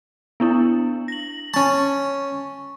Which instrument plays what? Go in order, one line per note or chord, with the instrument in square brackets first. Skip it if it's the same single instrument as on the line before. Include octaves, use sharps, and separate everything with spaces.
[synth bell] B3 D4 E4
A#6 F#7
[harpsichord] C#4 A5 [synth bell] C#6